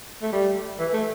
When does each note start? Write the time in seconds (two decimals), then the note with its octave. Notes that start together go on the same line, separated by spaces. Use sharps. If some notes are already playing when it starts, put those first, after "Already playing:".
0.22 A3
0.33 G3
0.79 E3
0.93 A3